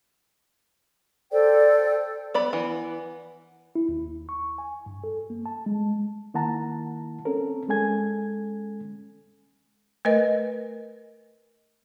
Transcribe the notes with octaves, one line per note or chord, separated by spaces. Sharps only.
A4 C5 D5 G5
B3 D5 B5
E3 B3
E4
D#2
C#6
G#5
G2
A4
A#3
A5
G#3
D#3 A#3 E4 F#5 A5 A#5
C4 C#4 A4 A#4
G#3 C#4 A4 G#5 G#6
A3 A#4 B4 D#5